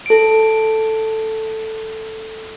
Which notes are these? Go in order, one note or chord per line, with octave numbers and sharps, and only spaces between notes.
A4 D7